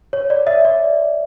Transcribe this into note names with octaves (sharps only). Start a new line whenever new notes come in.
C#5
D5
E5
D5